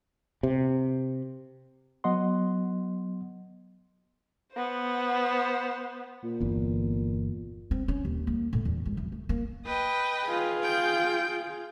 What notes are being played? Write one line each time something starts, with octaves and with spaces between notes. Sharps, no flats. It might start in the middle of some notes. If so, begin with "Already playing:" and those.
C3
F#3 B3 D#5 F#5 C6
B3 C5
A#2
G1 E2
C4
C#4
D#2
A#3
A2
E2
G#1
E3
A3
A#3
B4 D#5 G5
F4 G#4
G5 G6